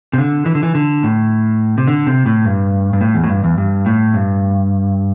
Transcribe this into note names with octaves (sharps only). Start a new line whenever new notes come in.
C3
D3
E3
D3
E3
D3
A2
C3
D3
C3
A2
G2
G2
A2
E2
A2
G2
E2
G2
A2
G2